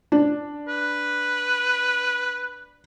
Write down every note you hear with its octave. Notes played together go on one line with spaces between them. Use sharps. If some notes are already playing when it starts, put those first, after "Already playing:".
D4
B4